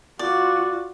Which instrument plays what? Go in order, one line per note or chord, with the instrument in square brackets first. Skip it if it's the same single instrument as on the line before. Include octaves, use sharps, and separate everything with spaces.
[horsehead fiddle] F4 F#4 [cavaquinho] D5